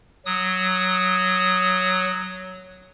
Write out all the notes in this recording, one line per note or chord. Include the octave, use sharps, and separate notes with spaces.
F#3 D#6